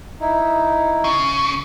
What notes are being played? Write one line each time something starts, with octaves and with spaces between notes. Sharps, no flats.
D#4 E4
C#3